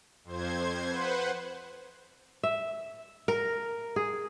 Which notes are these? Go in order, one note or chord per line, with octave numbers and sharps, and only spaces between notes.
F2 C5 G#6
B4 C5 F#5
E5
A#4
G#4